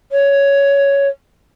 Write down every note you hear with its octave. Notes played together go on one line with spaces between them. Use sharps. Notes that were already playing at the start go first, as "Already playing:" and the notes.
C#5